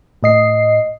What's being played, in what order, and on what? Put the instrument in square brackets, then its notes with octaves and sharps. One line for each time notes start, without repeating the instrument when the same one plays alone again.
[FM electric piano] A2 D#5 C7